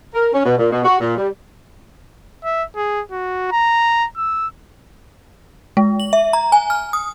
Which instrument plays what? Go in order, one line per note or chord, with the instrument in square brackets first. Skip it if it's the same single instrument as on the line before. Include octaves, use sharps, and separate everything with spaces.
[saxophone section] A#4
C#4
B2
A#2
B2
F#4
A#2
G3
[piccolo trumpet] E5
G#4
F#4
A#5
E6
[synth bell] G#3
F#7
E5
A#5
G#5
F6
D#6